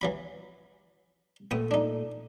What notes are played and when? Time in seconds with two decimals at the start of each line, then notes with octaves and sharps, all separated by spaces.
0.01 E3 F#3 B5
1.51 A#2 A3 B3 G5 D#6
1.71 D4 D#4